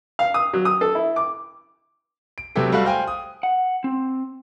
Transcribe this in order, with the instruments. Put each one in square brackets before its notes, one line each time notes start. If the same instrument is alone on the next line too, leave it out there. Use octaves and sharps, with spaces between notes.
[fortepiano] F5
D#6
F#3
D#6
A4
E4
D6
[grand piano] D7
C3 F#3 A3 B3 G4 A4
G3 A3 F#4 A4 F5 F#6
C5 F5 G5 G#5
D#6
[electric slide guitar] F#5
C4